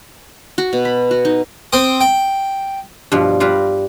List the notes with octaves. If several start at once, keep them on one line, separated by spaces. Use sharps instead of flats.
F#4
B2
B5
F#4
D#4
C4 G5 D#6
G5
G2 B2 F3
G3 F4 B4 A#5